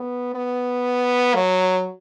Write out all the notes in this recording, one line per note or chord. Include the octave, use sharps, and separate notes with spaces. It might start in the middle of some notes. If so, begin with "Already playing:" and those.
Already playing: B3
B3
F#3